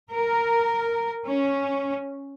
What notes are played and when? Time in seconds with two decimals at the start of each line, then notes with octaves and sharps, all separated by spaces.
0.12 A#4
1.27 C#4